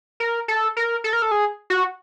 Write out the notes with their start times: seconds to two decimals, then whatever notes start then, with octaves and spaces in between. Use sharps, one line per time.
0.20 A#4
0.48 A4
0.77 A#4
1.04 A4
1.13 A#4
1.22 A4
1.31 G#4
1.70 F#4